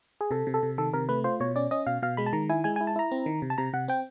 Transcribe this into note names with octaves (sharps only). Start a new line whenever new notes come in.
G#4
C3 A4
C3
A4
C3
D#3 A4
C3 A#4
A3 B4
F4 C5
B2 C#5
C#4 D5
C#4 D#5
B2 F5
B2 F5
G#3 B5
A5
D#3 A#5
E4 G#5
G#3 G#5
G#5
E4
A5
E4 A#5
C4
D#3
C3
A5
C3 A#5
C3 F#5
C4 G5